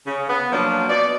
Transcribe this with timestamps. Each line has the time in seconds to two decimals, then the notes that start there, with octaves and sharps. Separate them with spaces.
0.07 C#3
0.29 B3
0.52 F3 F#3 A#3 C#4 D4
0.90 B2 D5